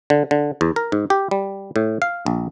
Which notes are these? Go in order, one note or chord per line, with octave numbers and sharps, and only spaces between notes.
D3
D3
E2
A#4
G#2
G4
G3
A2
F5
A#1